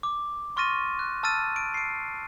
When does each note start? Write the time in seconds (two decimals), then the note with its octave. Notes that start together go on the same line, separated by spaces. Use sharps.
0.03 D6
0.57 C6 C#6 F6 A6 A#6 D#7
0.99 F#6
1.23 A5 E6 F6 A6 D#7
1.56 D7
1.74 C7 D7